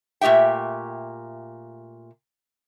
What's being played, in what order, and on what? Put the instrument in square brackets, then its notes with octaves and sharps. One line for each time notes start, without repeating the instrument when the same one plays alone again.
[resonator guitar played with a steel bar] A#2 A3 G4 E5 G5